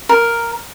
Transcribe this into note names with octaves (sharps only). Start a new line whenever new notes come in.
A#4